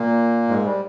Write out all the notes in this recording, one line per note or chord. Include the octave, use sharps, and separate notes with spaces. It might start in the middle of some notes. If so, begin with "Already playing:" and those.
Already playing: A#2 A#3
G#2 G#3
G3